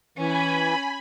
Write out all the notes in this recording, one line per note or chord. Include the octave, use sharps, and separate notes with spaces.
E3 C#4 G#5 B5